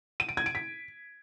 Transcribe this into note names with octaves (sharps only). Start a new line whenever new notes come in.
D#7
D7
G#6
D7
B6